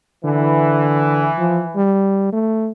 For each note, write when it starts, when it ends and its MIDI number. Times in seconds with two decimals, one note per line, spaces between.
0.25 1.30 50
0.25 1.81 52
1.38 1.62 53
1.76 2.30 55
2.33 2.71 57